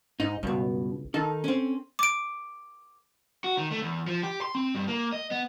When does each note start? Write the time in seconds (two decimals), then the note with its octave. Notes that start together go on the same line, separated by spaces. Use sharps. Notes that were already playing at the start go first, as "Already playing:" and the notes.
0.20 G#2 D#4
0.43 C#2 G2 B2
1.14 D#3 D#4 A4
1.44 C4 C#4
1.99 D6 D7
3.44 F#4
3.57 D#3
3.71 A3
3.82 E2
4.07 F3
4.23 G4
4.41 C6
4.55 C4
4.75 G2
4.88 A#3
5.13 D#5
5.31 B3